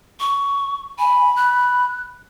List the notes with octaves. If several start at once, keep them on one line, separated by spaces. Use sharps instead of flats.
C#6
G#5 B5
F#6